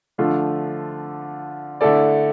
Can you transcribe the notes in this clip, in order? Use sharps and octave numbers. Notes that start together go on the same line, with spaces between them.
D3 F3 A3 D4 F4
D3 A3 E4 A4 D5